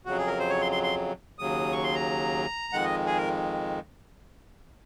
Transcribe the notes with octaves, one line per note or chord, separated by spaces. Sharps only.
F2 C#3 F#3 F#4
G#4
A#4
C5
C#5
C6
C6
C6
D#2 C#3 F#3 D#6
C#6
C6
A#5
F2 D#3 G#3 F#5
D#5
G#4
A#4